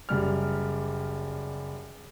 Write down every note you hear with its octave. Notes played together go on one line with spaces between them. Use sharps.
F#1 G3 F6